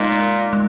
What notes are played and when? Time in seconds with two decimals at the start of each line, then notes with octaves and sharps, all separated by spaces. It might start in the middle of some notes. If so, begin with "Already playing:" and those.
Already playing: A#2 G#3 D#4 A#4 D#5
0.53 G#3